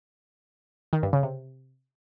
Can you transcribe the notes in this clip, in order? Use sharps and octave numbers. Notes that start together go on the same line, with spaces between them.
D#3
G2
C#3
C3